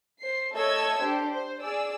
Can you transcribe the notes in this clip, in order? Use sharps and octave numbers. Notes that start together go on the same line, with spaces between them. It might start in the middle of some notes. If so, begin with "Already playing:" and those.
C5 C7
A3 A4 C#5 D#5 E6 G#6
D4 G4 A4 C5
C5
G#4 D5 E6